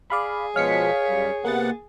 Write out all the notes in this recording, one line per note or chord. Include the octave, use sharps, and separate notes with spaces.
G#4 D5 F5 B5
B2 F3 G#3 C#5 F5 B6 C#7
F#2 G3
C3 A#3 B3 F#5 A6